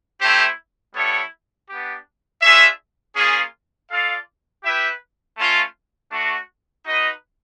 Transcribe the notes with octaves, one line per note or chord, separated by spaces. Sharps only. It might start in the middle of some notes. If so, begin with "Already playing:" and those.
A3 C4 E4 G4 C5
G3 B3 E4 A4 C#5
B3 D4 G4
D4 F4 G#4 C#5 E5
A#3 C#4 F4 G#4
F4 A4 D5 F5
E4 G4 B4 E5 G5
A3 C#4 F4
A3 D4 F#4
D#4 F#4 B4 D#5